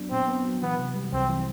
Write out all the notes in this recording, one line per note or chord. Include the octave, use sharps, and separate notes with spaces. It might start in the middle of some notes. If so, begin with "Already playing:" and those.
Already playing: F#3 B3 D4
A#2 C4
B3
F#3
E3 B3
C3
G3
C2 C4
E3